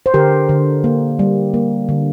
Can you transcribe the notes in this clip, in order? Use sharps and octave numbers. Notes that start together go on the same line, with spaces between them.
C5
D3 G4 A#4
D3
A#3
G3
A#3
D3